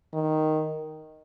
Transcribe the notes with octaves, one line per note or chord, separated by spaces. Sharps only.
D#3